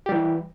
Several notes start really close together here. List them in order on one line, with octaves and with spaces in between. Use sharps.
G4 G3 E3